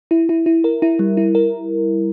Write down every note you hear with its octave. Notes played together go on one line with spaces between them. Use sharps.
E4
E4
E4
A#4
E4
G3
E4
A#4